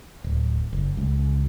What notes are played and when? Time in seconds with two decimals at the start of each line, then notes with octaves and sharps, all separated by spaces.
0.24 D1
0.73 F#1
0.97 C#2